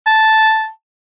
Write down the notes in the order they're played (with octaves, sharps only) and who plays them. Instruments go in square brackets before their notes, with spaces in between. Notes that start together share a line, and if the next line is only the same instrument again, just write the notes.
[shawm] A5